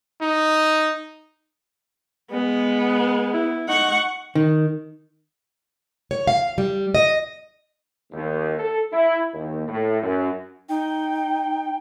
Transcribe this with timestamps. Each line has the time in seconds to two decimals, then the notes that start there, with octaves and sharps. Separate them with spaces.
0.22 D#4
2.31 G#3 B3
3.34 E4
3.68 D#4 F#5 C#6
4.35 D#3
6.11 C#5
6.27 F5
6.58 G3
6.95 D#5
8.12 D#2
8.58 A4
8.92 E4
9.34 D#2
9.67 A2
10.02 F#2
10.69 D#4 G5